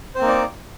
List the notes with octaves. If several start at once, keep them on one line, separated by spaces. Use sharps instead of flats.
A#3 C4 D#4 C5 D5